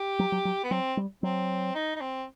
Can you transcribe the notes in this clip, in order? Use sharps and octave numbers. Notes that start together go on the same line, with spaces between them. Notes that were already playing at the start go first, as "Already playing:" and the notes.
Already playing: G4
F#3
F#3
F#3
B3
F#3 C4
G3
F#3 C4
D#4
D#4
C4